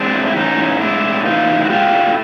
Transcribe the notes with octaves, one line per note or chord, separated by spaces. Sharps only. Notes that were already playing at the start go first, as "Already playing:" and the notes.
Already playing: G#3 C4 D4
A2
E4
E3 C#4 D#4
A2
G#3 D4 E4
A2
E3 D#4 F4
A2
F#4
G#3 F4 G4
A2